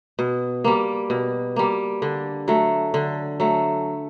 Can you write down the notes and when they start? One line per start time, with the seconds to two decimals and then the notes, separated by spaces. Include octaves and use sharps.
0.19 B2
0.64 G3 A#3
1.10 B2
1.56 G3 A#3
2.02 D3
2.48 F#3 A3
2.94 D3
3.40 F#3 A3